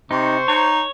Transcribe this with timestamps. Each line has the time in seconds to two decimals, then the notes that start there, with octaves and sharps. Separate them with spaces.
0.11 C3 D#4 C5 C#6
0.48 D#4 C#5